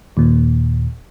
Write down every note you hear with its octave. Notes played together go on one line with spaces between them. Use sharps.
D#2 A#2